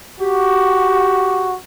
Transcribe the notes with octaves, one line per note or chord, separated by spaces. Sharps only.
F#4 G4